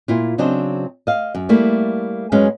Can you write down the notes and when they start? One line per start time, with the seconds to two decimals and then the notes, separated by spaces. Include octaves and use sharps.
0.08 A#2 E4 F4
0.38 C#3 F#3 C4 D4 C5 D#5
1.07 D#5 F5
1.35 F#2
1.49 G3 A3 A#3 E4
2.32 F#2 G#3 C#4 B4 F5